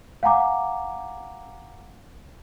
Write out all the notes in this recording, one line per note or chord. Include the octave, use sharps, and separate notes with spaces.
F5 F#5 G#5 A#5 D6